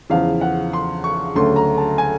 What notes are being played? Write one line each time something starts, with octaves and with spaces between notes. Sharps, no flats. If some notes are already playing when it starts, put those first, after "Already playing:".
E2 C#3 F3 F5
F#5
C6
C#6
D2 C#3 F#3 A3 C6
A#5
A5
G#5